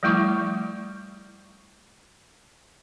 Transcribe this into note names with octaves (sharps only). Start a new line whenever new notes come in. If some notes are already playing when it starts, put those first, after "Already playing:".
F3 G3 A3 E4 C#6 D6